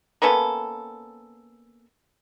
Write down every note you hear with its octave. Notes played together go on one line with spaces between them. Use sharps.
A#3 B3 C#4 A4